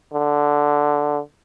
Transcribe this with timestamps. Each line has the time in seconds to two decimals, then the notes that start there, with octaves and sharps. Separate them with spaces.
0.14 D3